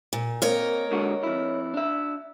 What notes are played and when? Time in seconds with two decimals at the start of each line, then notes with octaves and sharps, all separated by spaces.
0.13 A#2
0.42 A#3 C4 A#4 C#5 D#5
0.91 G#2 D3 F#4
1.23 F2 E4
1.74 D4 E5